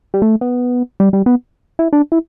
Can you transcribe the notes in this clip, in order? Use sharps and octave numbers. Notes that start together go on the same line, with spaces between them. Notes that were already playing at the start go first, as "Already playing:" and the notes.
G3
A3
B3
G3
G3
B3
E4
D4
E4